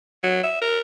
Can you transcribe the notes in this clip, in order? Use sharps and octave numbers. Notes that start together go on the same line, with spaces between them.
F#3
E5
A#4